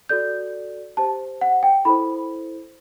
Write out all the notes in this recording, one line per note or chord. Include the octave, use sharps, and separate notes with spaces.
F#4 A4 D5 G6
G4 C5 A5
F#5
G5
E4 A4 C5 B5